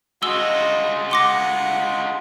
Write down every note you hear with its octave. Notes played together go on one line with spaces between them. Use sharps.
G#3 F4 F#4 D#5 E6 G7
F#5 C6 D6 A#6